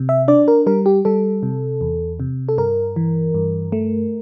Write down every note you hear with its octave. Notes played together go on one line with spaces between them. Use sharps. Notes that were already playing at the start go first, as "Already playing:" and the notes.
Already playing: C3
E5
D4 D5
A#4
G3 A#4
G4
G3 A4
C3
E2
C3
A4
G2 A#4
E3
G2
A3